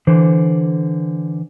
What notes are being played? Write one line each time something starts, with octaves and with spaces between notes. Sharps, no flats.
D3 E3 C5